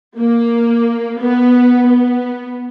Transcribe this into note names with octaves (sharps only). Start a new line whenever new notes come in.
A#3
B3
B3